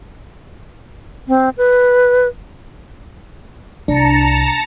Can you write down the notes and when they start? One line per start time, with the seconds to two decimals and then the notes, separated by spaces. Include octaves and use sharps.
1.28 C4
1.57 B4
3.88 C2 D4 A5 A#5 C#7